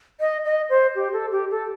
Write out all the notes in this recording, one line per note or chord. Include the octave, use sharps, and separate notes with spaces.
D#5
D#5
C5
G4
A4
G4
A4